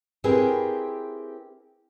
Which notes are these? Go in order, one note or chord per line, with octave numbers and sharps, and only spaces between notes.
C4 E4 G4 G#4 A#4 B4